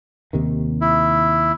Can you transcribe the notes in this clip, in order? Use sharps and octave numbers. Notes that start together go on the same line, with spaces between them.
D#2 C3 D#3
E4